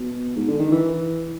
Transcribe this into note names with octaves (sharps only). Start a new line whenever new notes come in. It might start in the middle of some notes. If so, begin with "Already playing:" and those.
Already playing: B2
G#2
D3
D#3
E3